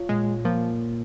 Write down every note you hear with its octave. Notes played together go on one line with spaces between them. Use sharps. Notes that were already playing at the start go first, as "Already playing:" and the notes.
Already playing: F4 C#5
A#2 G#3
F3 A#3